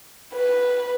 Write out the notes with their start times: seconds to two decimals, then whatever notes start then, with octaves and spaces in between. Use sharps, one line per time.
0.34 B4